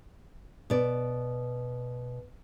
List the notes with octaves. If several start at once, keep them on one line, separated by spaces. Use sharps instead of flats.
B2 D5